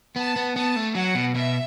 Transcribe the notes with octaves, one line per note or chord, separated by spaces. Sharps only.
B3 A5
B3
B3 A5
A3
F#3 F#5
B2
B2 E5